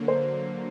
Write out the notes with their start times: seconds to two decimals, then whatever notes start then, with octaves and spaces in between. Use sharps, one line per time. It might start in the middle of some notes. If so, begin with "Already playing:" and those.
Already playing: D3 F#3 A#3
0.08 C5